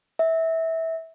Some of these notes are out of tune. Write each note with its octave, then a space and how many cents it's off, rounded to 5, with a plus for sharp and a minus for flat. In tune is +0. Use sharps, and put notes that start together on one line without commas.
E5 -20